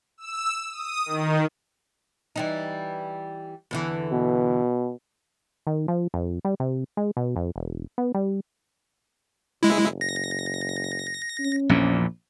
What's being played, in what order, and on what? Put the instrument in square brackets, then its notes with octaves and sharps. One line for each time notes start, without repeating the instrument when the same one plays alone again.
[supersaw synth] E6
D#6
D#3
[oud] E3 G3 D#4
E2 D3 E3
[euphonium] B2
[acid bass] D#3
F3
F2
G3
C3
G#3
B2
F2
E1
B3
G3
[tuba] F#1 [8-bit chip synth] G#3 E4
[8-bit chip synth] A#6
[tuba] C#4
[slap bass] A#1 E2 A#2